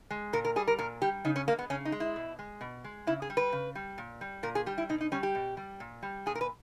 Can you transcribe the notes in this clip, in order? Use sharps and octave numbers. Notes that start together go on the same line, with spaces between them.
G#3
A#2 A#4
A#4
G3 G#4
A#4
A#2 A#4
G3 G4
C#3 D#4
C#4
G#3 A#3
B3
C#3 C#4
D#4
G#3
E4
B2
G#3
B2
G#3
C#3 E4
G#4
G3
B4
C#3
G3
A#2
G3
A#2 A#4
G#4
G3 G4
E4
B2 D#4
D#4
G3 C#4
G4
B2
G3
A#2
G3
A#2 G#4
A#4
B4